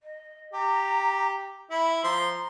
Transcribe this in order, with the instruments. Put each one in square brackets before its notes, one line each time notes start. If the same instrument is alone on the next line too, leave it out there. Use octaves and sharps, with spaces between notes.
[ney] D#5
[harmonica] G4 [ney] A#5
[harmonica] E4 [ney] B5
[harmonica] F3 C6 [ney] A#5